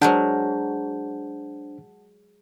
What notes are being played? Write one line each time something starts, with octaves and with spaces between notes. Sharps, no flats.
F#3 G#3 D4 A#4 C5 F#5 A5 G6